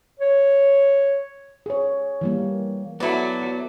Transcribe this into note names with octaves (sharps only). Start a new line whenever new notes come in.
C#5
G#4 C#5
E3 G3 A#3
F#3 B3 E4 A4 D5